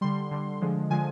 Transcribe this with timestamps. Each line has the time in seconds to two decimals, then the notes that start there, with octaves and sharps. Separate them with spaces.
0.01 D3 G3 C6
0.31 D3 G3
0.61 D3 F3 G#3
0.90 D3 F3 G#3 G#5